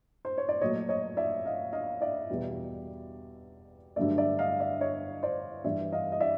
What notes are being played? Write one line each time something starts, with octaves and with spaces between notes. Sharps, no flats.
C5
C#5
D5
A#2 F#3 A3 C#5 D#5
C#5 D#5
D5 E5
D#5 F5
D#5 F5
D5 E5
E2 B2 G3 B3
G2 D3 F#3 A3 D5 E5
D5 E5
D#5 F5
D5 E5
C#5 D#5
C5 D5
G2 E3 G3 D5 E5
D#5 F5
D#5
D5 E5